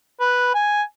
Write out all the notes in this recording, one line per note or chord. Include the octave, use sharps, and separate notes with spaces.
B4
G#5